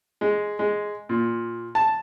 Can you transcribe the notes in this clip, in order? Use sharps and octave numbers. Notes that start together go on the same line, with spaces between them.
G#3
G#3
A#2
A5